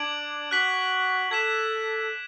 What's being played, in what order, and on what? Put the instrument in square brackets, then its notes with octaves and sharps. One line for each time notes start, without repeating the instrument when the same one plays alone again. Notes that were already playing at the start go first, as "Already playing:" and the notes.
Already playing: [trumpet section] D4 [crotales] D6 G#6 D7 F#7
[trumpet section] F#4 [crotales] F#6 B6 F#7
[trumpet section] A4 [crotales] G#6 B6 E7